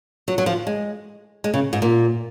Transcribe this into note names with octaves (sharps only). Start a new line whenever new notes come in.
F#3
F#3
F3
G#3
G#3
C#3
G#2
A#2